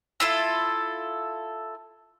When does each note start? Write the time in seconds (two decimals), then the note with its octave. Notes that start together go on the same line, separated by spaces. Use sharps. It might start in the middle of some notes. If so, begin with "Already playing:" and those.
0.20 E4 F4 A4